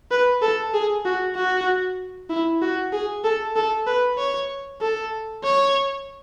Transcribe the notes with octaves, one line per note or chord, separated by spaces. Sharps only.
B4
A4
G#4
F#4
F#4
E4
F#4
G#4
A4
A4
B4
C#5
A4
C#5